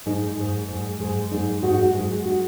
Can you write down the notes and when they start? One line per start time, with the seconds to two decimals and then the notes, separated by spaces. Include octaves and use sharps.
0.06 G#2 G#3 D#4
0.37 G#2 G#3
0.68 G#2 G#3
1.00 G#2 G#3
1.31 G#2 G#3 D#4
1.62 G#2 G#3 F#4
1.70 D#4
1.78 F#4
1.94 G#2 G#3 G#4
2.26 G#3 F#4